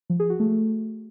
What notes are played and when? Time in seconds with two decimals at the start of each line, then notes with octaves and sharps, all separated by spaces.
0.10 F3
0.20 G#4
0.30 F#4
0.40 A3